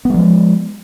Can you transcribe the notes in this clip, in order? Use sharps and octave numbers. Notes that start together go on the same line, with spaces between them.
F3 G3 G#3 B3